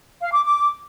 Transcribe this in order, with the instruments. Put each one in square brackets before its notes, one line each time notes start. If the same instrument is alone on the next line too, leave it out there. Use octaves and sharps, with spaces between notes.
[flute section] F5
D6
D6